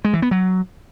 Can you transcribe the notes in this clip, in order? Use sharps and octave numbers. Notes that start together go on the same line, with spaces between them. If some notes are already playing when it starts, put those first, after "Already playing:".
G#3
E3
B3
F#3